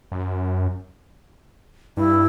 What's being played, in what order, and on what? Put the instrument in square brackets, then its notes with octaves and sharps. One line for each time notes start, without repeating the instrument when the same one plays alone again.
[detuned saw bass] F#2
[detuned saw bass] G2 [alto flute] E4